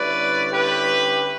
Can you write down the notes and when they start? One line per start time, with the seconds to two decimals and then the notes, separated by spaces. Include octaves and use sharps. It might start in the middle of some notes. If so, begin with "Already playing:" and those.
Already playing: D3 G3 C#4 E4 B4 D5
0.51 G4 B4